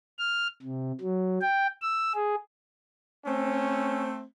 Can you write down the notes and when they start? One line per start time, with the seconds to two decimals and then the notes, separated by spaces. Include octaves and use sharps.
0.18 F6
0.62 C3
1.01 F#3
1.42 G5
1.82 E6
2.15 G#4
3.25 A3 C4 C#4